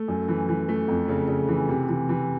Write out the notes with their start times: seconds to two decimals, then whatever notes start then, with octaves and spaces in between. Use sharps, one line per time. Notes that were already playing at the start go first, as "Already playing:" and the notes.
Already playing: A3
0.08 F#2
0.28 E3
0.49 E3
0.69 A3
0.88 F2
1.08 C#3
1.28 C#3
1.48 E3
1.69 C3
1.89 E3
2.09 E3